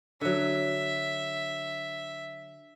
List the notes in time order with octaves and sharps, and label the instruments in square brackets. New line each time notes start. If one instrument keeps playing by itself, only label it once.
[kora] D3 F#3 [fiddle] E5